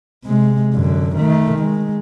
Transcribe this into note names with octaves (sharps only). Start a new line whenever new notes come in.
C3 G#3
F#2 D3
D#3 A3
G#3